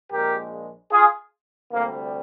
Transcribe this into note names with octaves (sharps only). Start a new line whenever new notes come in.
A#1 A#2 G#3 G4 A#4
F4 G#4
D2 C3 G3 A#3